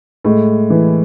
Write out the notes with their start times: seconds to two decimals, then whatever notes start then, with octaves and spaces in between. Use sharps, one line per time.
0.24 A2 G#3
0.70 E3